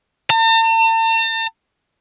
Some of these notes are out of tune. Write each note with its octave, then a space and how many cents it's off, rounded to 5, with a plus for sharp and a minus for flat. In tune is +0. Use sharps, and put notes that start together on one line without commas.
A5 +45